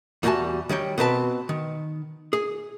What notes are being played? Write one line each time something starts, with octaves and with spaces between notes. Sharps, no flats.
E2 G3 F#4 E5 G#5 A5
D#3 G3 C#5 G5
B2 C4 B4 A5
D#3
G#4